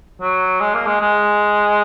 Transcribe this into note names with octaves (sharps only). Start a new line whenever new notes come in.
F#3
G#3
A#3
G#3
G#3